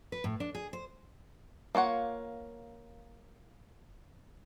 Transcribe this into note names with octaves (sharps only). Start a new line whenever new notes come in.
B4
A2
D4
G#4
C5
A#3 F4 C#5 F#5